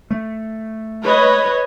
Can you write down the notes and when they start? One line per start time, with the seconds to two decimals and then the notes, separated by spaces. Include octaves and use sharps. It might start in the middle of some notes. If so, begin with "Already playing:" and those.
0.11 A3
1.01 B4 C#5 D#5